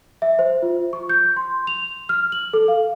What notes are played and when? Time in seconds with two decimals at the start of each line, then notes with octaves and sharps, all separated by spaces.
0.22 E5
0.39 C5
0.62 F4
0.93 C#6
1.09 G6
1.37 C6
1.67 F7
2.09 F6
2.32 F#7
2.53 A4
2.68 F5